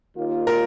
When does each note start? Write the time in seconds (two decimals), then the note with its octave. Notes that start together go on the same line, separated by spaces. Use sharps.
0.17 D#2 D#3 A#3 F4
0.47 A#4